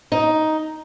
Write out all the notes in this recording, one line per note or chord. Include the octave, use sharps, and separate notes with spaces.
D#4